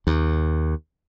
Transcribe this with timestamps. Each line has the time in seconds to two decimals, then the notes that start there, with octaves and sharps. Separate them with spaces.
0.07 D#2